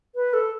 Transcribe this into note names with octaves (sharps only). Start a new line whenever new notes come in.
B4
A4